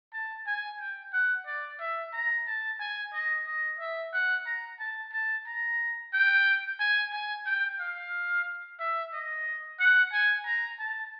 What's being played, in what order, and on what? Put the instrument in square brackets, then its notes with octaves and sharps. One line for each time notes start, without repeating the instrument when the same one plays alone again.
[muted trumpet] A5
G#5
G5
F#5
D5
E5
A#5
A5
G#5
D#5
D#5
E5
F#5
A#5
A5
A5
A#5
G5
G#5
G#5
G5
F5
E5
D#5
F#5
G#5
A#5
A5